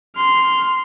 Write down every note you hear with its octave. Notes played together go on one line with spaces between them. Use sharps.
C6 F6